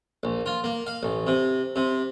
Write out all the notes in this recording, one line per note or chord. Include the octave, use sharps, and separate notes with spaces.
A#1
F4
A#3
F5
A1
C3
C3